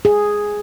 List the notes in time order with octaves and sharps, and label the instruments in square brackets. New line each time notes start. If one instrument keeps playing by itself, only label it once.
[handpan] G#4